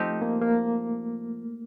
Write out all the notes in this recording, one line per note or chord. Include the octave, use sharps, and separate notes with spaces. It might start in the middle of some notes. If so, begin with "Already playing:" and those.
Already playing: F3 A3 C4 D#4 G4
A#3
A#3